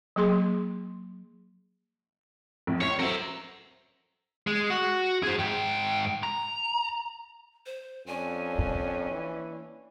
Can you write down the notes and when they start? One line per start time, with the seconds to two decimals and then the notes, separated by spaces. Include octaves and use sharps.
0.16 F#3 A#3 G#4 C6
2.67 A#1 F2 A2
2.81 C#2 C#5 C7
3.00 F#3 A4 A#4 C5 E5
4.47 G#3
4.70 F#4
5.23 G#4 C5
5.39 G#2 G5
6.23 A#5
7.66 C5
8.06 F2 C#4 D4 G#5
8.59 A#3
9.11 E3